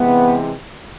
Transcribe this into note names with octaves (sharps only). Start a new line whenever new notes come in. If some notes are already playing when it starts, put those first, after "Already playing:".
Already playing: C3 E3 G#3 B3